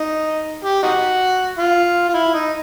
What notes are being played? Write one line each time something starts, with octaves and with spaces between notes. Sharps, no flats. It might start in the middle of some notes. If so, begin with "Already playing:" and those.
Already playing: D#4
G4
D#4 F#4
F4
F4
E4
D#4